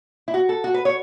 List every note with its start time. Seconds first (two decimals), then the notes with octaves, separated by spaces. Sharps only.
0.28 E4
0.34 F#4
0.49 A4
0.64 F#4
0.74 B4
0.85 C#5